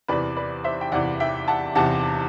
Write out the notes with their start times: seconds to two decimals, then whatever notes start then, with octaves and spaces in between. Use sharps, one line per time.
0.08 E2 C3 E3 B4 D5
0.37 B4 D5
0.64 C5 E5
0.81 G5
0.92 E2 C3 E3 D5 F#5
1.20 E5 G5
1.48 F#5 A5
1.75 E2 C3 E3 F#5 A5